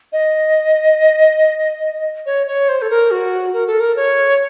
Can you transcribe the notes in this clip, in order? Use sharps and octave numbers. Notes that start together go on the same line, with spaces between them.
D#5
C#5
C#5
C5
A4
A#4
F#4
A#4
A4
A#4
C#5